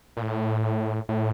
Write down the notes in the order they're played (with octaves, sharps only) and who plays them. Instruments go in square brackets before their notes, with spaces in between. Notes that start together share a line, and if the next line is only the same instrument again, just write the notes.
[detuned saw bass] A#2
A2
A2